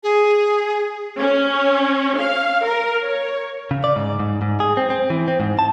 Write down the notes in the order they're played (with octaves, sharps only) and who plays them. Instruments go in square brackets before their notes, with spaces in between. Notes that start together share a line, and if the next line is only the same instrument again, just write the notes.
[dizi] G#4
[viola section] C#4
F5
A#4
C#5
[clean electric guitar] C#3
D5
G#2
G#2
G#2
G#4
C4
C4
E3
C4
G#2
A5